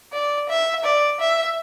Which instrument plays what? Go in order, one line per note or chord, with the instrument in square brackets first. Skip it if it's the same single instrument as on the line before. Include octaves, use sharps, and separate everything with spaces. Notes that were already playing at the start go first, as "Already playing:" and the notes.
[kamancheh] D5
E5
D5
E5